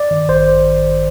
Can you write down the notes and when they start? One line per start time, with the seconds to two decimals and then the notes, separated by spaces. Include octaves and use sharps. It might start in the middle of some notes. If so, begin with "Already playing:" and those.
Already playing: D5
0.11 G2 D#3
0.29 A1 C5